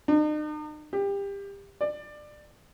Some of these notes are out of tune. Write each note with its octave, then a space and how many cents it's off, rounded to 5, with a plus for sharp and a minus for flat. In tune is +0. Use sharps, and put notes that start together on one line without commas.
D#4 -45
G4 +25
D5 +20